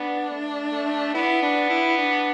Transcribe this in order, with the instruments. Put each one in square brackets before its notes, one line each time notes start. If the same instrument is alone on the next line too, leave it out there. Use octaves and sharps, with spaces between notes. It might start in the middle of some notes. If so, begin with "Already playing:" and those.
Already playing: [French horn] B3 [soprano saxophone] D4
[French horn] A3
A3
[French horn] B3 [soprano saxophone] E4
[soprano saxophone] D4
E4
D4